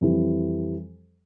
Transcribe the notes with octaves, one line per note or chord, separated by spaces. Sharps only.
F2 E3 G3